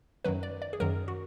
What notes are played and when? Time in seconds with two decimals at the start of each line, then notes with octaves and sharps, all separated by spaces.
0.24 F#2 D#3 F#3 B4
0.43 D5
0.62 D5
0.73 G#4
0.80 F#2 D#3 F#3 A#4
1.08 F#4